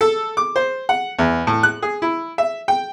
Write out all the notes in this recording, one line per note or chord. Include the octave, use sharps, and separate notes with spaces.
A4
D6
C5
F#5
E2
A2
F#6
G#4
E4
E5
G5